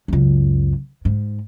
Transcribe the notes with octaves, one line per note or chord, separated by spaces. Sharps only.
C#2 F#2
G#2